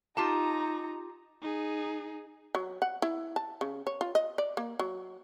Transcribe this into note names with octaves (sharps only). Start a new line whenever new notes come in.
D#4 F4 G4 A5 A#5
D#4 G#4
F#3
F#5
E4
A5
C#3
C#5
F4
D#5
D5
A#3
F#3